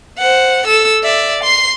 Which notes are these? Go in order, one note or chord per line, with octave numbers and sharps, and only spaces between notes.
C5 F#5
A4 E6
D5 E5
C6 C7